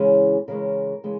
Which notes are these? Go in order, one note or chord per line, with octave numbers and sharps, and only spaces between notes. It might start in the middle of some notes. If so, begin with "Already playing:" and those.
Already playing: C#3 E3 G#3 C#4
C#3 E3 G#3 C#4 A#4
C#3 E3 G#3